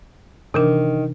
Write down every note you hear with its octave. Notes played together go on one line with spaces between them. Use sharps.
C3 D#3 E3 D4